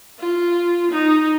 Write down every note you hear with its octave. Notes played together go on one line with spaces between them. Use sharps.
F4
D#4